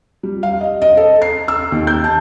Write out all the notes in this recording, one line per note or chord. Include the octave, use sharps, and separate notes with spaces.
G3
F5
D#5
D#5
A4
C7
E6
D#2
G6
A5